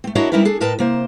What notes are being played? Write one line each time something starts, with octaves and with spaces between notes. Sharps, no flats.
A3 C4
D4 E4 F#4 A#4 C#5 D#5
G3 C#4 D#4 E4 A#4 B4
D4 G#4 A4
A2 A#4 B4 D#5 A5
C3 A#3 C5